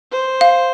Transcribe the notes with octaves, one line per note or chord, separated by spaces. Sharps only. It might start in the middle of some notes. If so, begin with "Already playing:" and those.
C5
F5